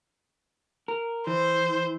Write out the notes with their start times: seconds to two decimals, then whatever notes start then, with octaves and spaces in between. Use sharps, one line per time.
0.88 A#4
1.27 E3 C5